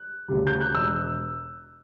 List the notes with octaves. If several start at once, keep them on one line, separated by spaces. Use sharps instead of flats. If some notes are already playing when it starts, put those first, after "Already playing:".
Already playing: F#6
D2 C#3 G3
G6
F#6
E1 E6